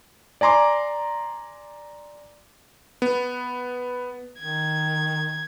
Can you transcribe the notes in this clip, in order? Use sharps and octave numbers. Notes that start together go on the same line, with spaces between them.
D5 G#5 A#5 C6 D6
B3
D#3 G#6